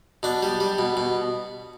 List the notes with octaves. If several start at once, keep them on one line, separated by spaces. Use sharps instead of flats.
B2 D4
G3
G3
B2
B2